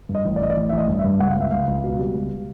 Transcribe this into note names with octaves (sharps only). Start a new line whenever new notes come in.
G2
D#5
A1
D5
A1 D#5
D5
A1
A1 E5
D#5
G2
E5
G2
C#2 F#5
F5
C#2 E5
C#2 F5
C#2
B2
G3
C#2